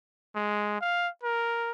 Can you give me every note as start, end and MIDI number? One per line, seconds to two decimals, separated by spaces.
0.35 0.79 56
0.81 1.08 77
1.23 1.72 70